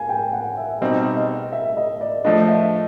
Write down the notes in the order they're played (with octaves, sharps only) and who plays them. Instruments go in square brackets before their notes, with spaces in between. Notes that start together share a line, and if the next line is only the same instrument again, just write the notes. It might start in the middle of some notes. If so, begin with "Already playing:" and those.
Already playing: [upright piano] F5 G#5
G5
F#5
E5
[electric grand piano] B2 G3 C4 D#4 [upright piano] D#5
[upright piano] D#5
E5
D#5
D5
[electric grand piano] F3 A3 D4 [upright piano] D#5
[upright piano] E5